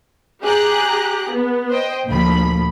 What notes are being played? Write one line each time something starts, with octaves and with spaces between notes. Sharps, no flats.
G4 G#4 A#5 F#6
B3
C5 D#5 G5
D2 A#2 F3 B5